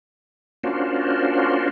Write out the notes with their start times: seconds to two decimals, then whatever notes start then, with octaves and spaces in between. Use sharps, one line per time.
0.63 A#3 C#4 D4 F4 F#4 C5